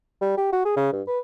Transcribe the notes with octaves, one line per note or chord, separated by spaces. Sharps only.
G3
G4
F#4
G#4
C#3
G2
B4